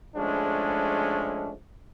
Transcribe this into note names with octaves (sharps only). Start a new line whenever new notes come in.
G#2 F3 G#3 A3 C#4 D4